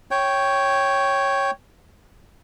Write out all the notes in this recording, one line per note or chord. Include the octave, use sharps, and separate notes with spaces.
C#5 G5